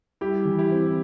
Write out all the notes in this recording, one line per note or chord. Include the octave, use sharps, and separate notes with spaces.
G3 E4 G4
E3
E4 G4
C4